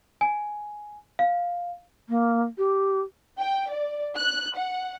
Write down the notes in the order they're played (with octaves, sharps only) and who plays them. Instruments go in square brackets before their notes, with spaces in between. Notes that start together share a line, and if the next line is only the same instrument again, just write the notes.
[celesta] G#5
F5
[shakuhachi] A#3
G4
[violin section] G5
D5
F#6
F#5